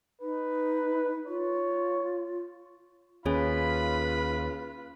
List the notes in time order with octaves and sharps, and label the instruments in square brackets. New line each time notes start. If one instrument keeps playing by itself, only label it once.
[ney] D#4 [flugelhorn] B4
[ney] F4 [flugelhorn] C#5
[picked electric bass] D#2 [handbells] C#4 G#4 C#5 [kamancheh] F4 B4 [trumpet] B5